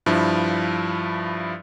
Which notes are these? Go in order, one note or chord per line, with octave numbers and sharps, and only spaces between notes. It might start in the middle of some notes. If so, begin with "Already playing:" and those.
G2 F3 E4